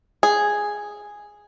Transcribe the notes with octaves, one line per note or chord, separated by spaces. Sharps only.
G#4